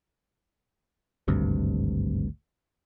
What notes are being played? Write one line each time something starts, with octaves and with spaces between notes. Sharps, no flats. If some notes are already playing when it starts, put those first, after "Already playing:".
G#1 D2 G2 C3